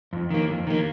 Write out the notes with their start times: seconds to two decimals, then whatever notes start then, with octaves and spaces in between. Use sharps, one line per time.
0.13 F2
0.31 D#3 A#3
0.50 F2
0.67 D#3 A#3